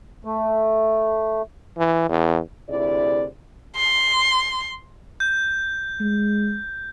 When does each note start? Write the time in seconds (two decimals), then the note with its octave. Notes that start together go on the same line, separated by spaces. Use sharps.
0.25 A3
1.77 E3
2.09 E2
2.69 D2 C3 E4 G#4 D5
3.77 C6
5.20 G6
6.00 G#3